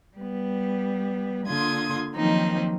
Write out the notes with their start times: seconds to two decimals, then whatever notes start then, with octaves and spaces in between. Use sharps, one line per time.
0.18 G3 B3
1.48 D3 A#3 F4 C6 D#6 G#6
2.15 D#3 F3 F#3 A#3 C4 D#4